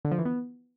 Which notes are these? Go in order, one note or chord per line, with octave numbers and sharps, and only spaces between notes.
D3
F3
E3
B3